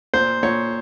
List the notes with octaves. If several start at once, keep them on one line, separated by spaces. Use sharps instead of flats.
A#2 C5
A#2 C#5